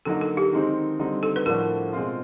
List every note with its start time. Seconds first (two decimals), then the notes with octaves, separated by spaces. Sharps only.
0.05 D3 F#3 A#3 D#4 A4
0.21 A4
0.37 G4
0.53 D#3 G#3 C4 D#4
0.99 D3 G3 C4 D#4
1.23 A4
1.36 B4
1.46 A2 F3 A3 D4 F#4 A#4
1.93 B2 G#3 C4 F4